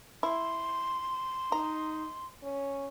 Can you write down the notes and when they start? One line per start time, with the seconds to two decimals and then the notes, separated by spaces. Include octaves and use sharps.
0.23 E4 C6
1.52 D#4 A#5
2.43 C#4